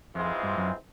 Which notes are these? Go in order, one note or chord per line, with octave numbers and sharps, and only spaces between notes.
F2 G#2 E3 G#3 C4 F4
G2
F#2